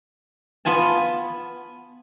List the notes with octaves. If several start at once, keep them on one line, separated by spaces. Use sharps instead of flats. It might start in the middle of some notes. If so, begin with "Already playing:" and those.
B3 F4 G#5 A5